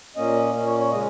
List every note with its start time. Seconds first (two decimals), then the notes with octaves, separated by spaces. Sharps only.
0.16 A#2 A#3 C#4 D#5
0.54 A#2 A#3 C#4
0.67 C#5
0.79 C#5
0.91 C#3 G#3 C#4 D#5